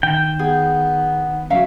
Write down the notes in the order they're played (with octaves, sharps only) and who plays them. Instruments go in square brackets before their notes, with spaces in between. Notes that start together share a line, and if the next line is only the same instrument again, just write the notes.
[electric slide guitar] D#3 [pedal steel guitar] G5
[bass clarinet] B3 [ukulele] G#4
[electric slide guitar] F#3 G3 C#4 [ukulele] E5 F5 A#5